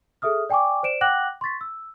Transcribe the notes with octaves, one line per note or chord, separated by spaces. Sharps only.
G#4 A4 E5 D#6 F6
D5 G5 G#5 C#6 D6
C5 D5 D7 E7
F#5 G5 D6 F#6 A#6 F#7
C6 C#6 A6 B6
E6